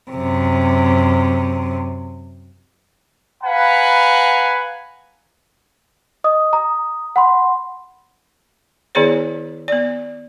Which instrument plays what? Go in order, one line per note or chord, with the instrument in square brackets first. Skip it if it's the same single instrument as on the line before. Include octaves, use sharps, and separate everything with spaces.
[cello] F#2 C3
[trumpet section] B4 F5 F#5 G#5 A#5 B5
[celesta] D#5 D#6
A#5 D#6
F#5 B5 C6
[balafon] D#3 B3 E4 G#4 C#5 D5
B3 D5